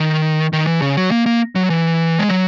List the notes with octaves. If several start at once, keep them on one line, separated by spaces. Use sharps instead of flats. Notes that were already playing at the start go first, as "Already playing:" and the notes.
Already playing: D#3
D#3
E3
C#3
F#3
A#3
A#3
F#3
E3
G#3
F#3